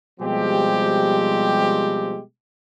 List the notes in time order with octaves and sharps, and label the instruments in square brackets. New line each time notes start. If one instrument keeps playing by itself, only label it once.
[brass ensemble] B2 F3 G3 G#3 C4 G4